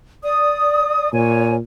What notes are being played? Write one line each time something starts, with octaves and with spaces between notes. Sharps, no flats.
D5 D#6
A#2 C#5 G#5